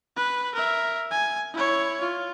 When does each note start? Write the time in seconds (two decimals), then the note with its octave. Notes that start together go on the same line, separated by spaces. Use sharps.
0.16 B4
0.55 A#4 E5
1.11 G#5
1.53 E4 C#5
2.01 F4